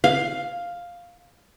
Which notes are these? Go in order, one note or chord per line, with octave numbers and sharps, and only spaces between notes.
F5